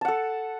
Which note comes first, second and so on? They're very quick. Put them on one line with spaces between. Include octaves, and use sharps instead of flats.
A5 F#5 A4